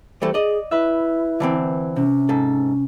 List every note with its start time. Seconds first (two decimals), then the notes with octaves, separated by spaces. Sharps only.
0.22 E3 G3 A3 C5
0.34 G#4 D5 D#5
0.71 E4 B4 E5
1.40 D3 E3 C4
1.96 C3 C#4
2.29 G#2 A4